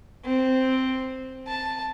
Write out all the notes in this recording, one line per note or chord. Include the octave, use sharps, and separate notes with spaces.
C4
A5